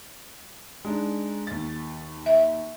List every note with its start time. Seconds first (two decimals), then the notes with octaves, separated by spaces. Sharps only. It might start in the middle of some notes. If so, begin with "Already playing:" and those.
0.85 G#3 D4 D#4
1.47 D#2 A6
2.26 E5